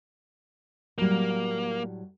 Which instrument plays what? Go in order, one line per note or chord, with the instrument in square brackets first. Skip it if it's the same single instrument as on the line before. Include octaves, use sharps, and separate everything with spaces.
[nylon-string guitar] A2 F#3 G3 [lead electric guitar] A#3